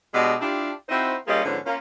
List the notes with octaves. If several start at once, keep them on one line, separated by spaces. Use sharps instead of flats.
B2 G#3 D4 G4 D#5
D4 E4 F4 G4
C4 D#4 E4 F#4 C5
G3 A#3 C#4 F4 G#4 D#5
G#2 D3 F3 B3 C#4
A#3 C#4 F4